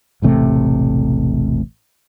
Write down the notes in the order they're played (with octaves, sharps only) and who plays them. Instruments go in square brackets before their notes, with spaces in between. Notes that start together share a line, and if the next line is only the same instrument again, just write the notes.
[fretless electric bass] E1 A1 C3 A3